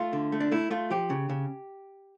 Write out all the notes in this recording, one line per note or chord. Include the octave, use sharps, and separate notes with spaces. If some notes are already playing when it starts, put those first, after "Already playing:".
Already playing: A3 F4
D3
A3
D4
A3 E4
A3 F4
F3 G4
C#3
C#3